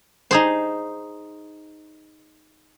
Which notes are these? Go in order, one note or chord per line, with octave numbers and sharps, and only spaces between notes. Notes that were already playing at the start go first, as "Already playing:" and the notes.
D#4 G#4 C5